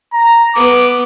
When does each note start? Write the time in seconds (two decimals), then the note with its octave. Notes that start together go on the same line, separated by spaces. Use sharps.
0.13 A#5
0.56 B3 D6